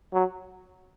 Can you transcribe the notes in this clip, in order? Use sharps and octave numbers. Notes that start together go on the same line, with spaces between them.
F#3